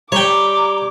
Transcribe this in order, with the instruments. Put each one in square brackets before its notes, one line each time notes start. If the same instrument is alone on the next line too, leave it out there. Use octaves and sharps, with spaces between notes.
[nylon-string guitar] G3 [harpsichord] C#5 G5 [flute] A#5 [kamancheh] D6